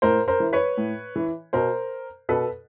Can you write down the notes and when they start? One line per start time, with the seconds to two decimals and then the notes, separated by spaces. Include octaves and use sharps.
0.02 A2 A#4 C5
0.28 A#4 C5
0.40 E3
0.53 B4 C#5
0.77 A2
1.16 E3
1.53 B2 A#4 C5
2.29 B2 A4 B4